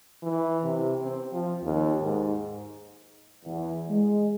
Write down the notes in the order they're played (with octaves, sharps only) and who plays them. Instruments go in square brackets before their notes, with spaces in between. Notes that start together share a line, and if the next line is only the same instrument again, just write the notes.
[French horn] E3
C3
C4
F3
D#2
G#2
[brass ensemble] E2
G#3